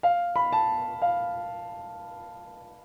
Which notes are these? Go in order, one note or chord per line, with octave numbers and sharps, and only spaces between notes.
F5
B5
A5
F5